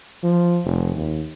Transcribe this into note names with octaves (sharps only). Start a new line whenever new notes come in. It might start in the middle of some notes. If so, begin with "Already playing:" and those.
F3
F1
D#2